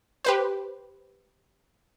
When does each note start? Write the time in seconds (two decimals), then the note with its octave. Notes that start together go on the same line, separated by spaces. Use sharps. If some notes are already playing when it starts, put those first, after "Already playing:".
0.25 G4 B4 C5